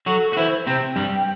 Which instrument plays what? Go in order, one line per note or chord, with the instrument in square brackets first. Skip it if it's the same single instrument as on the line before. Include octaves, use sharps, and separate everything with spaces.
[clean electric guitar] F#3 F#4 [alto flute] A4
[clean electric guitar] F#4
[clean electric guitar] E3 E4 [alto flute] C5
[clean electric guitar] C3 C4 [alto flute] G5
[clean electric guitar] G2 G3